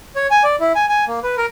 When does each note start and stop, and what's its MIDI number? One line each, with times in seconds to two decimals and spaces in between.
0.16 0.27 73
0.31 0.43 80
0.44 0.56 74
0.60 0.72 64
0.75 0.85 80
0.89 1.04 80
1.07 1.19 58
1.23 1.35 71
1.38 1.46 70